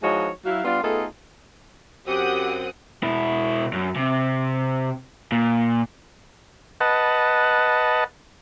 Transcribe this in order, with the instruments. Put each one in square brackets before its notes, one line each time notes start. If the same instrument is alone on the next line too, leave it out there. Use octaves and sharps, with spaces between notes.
[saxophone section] F3 G#3 D#4 E4 F#4 C#5
F#3 E4 F5
G3 B3 D4 F4
A3 B3 D#4 F4 G#4 A4
[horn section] F#2 C4 [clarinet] G4 [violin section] F#5 G5 D#6
[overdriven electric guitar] B2 E4
F#2
C3
A#2
[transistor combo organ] B4 D#5 F#5 A5